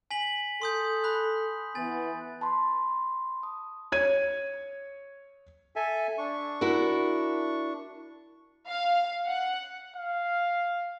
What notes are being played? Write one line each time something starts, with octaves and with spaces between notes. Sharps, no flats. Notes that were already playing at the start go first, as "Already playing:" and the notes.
G#5 B6 F#7
A4 C6 D#6 G6
B5 F#6
E3 B3 G#5 A6
A5 B5 C6
D#6
C#5 G#6 D#7
A4 E5 G#5
D4 C#6
E4 F#4 A#4
F5
F#5
F5